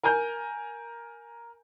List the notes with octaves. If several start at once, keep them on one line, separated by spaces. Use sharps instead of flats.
A#4 G#5 A#5 G6